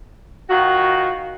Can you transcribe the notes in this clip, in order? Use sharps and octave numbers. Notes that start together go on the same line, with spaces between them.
D#3 F4 F#4